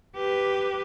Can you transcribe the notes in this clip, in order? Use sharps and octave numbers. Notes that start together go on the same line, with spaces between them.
G4 B4